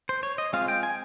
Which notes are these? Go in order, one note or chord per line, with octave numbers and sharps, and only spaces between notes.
C5
C#5
D#5
G#3 C4 F4 F5
G5
G#5